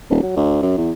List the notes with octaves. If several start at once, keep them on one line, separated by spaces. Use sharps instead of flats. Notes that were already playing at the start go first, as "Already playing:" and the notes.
D#1
F#3
D2
F#2
E2